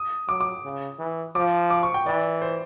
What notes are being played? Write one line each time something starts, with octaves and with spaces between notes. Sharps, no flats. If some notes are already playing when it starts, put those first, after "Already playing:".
Already playing: D#6
F#3 D6
D6
C#3
E3
F3 D6
D6
C#6
G5
E3 D5
C5